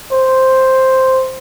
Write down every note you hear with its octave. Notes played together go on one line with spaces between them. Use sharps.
C5